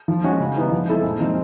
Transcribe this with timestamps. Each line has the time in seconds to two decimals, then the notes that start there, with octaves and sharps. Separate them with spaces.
0.08 F3
0.24 G#3 C#4 F#4
0.40 C#3
0.56 E3 G3 B3 D#4
0.71 F3
0.87 G#3 C4 E4 A4
1.03 A#2
1.19 F3 G#3 C4 D#4